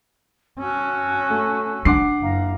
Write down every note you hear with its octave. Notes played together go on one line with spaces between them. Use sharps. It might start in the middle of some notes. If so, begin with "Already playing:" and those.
C#4 F#4 A5 E6
A3
D4 F#5 D6 C7
F#1 F5 A#5